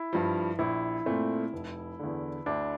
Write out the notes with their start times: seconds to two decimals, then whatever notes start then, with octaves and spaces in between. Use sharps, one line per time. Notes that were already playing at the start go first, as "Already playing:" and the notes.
Already playing: E4
0.13 G2 F3
0.59 A#1 E4
1.06 A#2 A3 C4
1.53 F1
1.99 E2 D3
2.46 D2 D4